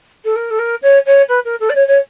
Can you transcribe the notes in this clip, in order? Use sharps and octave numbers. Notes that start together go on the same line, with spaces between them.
A4
A#4
A4
A#4
C#5
C#5
B4
A#4
A4
D5
C#5
C#5